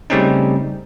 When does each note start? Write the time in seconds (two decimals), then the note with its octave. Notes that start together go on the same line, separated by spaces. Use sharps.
0.10 C#3 G3 A3 C4 C#4 D#4